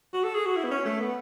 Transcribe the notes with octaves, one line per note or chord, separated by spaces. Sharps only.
F#4
A4
G#4
F#4
E4
B3
C#4
A3
B3